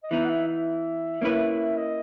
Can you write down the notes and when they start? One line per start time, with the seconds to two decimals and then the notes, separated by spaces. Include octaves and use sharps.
0.03 D#5
0.11 E3 B3 D#4 E5
0.25 F#5
0.30 E5
0.48 E5
1.22 A#3 C#4 E4 B4
1.77 D#5